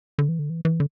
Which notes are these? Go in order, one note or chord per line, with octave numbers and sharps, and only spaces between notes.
D3
E3
D3
E3
E3
D3